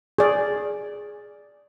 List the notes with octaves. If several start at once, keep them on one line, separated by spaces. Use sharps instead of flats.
G#4 D5